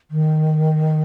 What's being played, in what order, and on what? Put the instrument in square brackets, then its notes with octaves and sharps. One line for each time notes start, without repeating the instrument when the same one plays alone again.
[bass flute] D#3